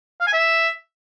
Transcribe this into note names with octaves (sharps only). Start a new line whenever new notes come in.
F5
G#5
E5